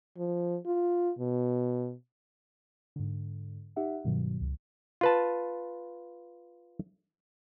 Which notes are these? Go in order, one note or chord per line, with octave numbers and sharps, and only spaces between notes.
F3
F4
B2
G#2 D3
D#4 G4 E5 F#5
G2 B2 D#3 F#3
C#2
F4 B4 A5